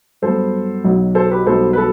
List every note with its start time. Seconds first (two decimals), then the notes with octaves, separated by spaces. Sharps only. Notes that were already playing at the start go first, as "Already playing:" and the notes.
0.22 G2 F#3 B3 A4 C5
0.84 B1 B2 F#3
1.15 A4 C5
1.31 G4 B4
1.46 B1 B2 G3 B3 A4 C5
1.73 B4
1.77 A4